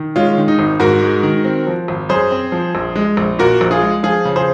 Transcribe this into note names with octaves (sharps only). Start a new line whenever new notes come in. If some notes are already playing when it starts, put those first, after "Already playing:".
Already playing: D#3
G#3 C#4 F4
D#3
D#4
G#1
G#2 F#4 A#4
G#3
D#3
C4
F3
G#1
F#2 G#4 C5
C4
F3
A#1
G#3
A#1
A#2 F#4 A#4
A#1
F4 G#4
G#3
F3 F4 G#4
C#3
G#4 C5